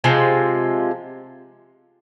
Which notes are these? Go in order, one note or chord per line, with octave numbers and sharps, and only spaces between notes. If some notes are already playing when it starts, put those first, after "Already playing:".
C3 F3 G#3